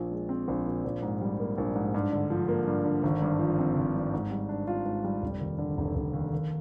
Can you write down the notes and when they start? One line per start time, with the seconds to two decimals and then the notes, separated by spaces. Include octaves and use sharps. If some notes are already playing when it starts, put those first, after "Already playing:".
Already playing: A#1 A#2
0.11 G#3
0.29 C4
0.48 A#1
0.66 A#2
0.85 A#1
1.02 G#2
1.21 G3
1.39 A#3
1.58 A#1
1.75 G#2
1.94 G2
2.12 D3
2.30 F3
2.48 A#3
2.67 G2
2.85 D3
3.03 G#1
3.22 G2
3.39 F3
3.59 C4
3.77 G#1
3.95 G2
4.14 G#2
4.31 G3
4.49 D4
4.68 F4
4.86 G#2
5.04 G3
5.23 F1
5.41 D#2
5.58 D3
5.78 F1
5.96 F1
6.14 D#2
6.32 D#2